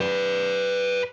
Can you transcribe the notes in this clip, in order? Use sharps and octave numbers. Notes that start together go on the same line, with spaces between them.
B4 D5